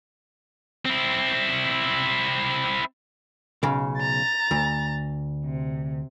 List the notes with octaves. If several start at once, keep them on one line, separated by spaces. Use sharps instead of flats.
C4 E4
B1 C#3
A#5 A6
D2
C3